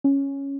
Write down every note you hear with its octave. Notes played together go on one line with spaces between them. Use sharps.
C#4